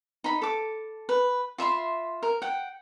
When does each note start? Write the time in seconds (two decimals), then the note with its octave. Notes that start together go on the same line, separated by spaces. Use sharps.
0.24 D#4 B5
0.42 A4 D6
1.09 B4
1.58 F4 E5 B5 C6
2.23 A#4
2.42 F#5 G5